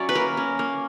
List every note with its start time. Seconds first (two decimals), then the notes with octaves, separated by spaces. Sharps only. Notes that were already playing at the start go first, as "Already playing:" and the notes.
Already playing: F#3 C#4 D5 E5
0.09 B4
0.15 A#3 A#4
0.37 C#4
0.59 A#3